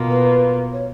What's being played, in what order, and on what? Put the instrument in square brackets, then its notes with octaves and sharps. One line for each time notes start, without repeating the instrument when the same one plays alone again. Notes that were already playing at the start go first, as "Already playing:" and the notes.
Already playing: [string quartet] B2 A#3 F4
[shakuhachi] B4
C#5